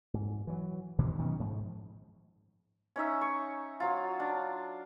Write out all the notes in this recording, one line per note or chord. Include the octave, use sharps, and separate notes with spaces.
G#2
E3 F#3
G2 B2 D#3 E3
D#3 F#3 B3 C#4
G#2 F3
C#4 D#4 E5
C#6
F#3 F4
D4